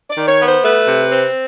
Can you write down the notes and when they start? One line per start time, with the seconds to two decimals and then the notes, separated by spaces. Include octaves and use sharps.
0.10 D5
0.17 D#3
0.28 C#5
0.39 B3
0.46 C5
0.63 A3 B4
0.86 C3
1.10 C4